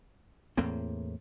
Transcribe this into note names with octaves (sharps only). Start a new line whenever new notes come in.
E2 A2 A#3 C4